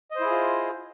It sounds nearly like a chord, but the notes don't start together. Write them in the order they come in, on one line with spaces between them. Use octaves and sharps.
D#5 C5 E4 G#4 F4